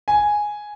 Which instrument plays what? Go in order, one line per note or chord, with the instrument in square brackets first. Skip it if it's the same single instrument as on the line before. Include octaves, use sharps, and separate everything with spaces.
[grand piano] G#5